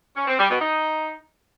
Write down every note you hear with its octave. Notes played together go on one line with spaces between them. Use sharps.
C#4
C4
G3
B2
D#4